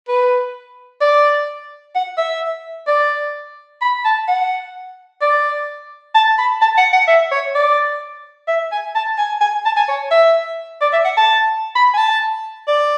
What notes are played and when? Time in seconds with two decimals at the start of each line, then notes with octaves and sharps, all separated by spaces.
0.08 B4
1.01 D5
1.95 F#5
2.17 E5
2.87 D5
3.82 B5
4.05 A5
4.28 F#5
5.21 D5
6.15 A5
6.38 B5
6.61 A5
6.78 F#5
6.93 F#5
7.08 E5
7.31 C#5
7.55 D5
8.48 E5
8.72 G#5
8.95 A5
9.18 G#5
9.41 G#5
9.65 A5
9.77 G#5
9.88 C#5
10.11 E5
10.81 D5
10.93 E5
11.04 F#5
11.17 A5
11.76 B5
11.94 G#5
11.98 A5
12.68 D5